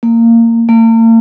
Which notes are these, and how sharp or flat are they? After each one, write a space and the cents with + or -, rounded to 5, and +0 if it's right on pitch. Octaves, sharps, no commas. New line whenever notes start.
A#3 -20
A#3 -45